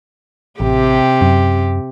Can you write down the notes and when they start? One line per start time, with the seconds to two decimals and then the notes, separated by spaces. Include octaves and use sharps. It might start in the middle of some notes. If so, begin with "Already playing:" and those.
0.60 A1 C3 G4
1.21 F#2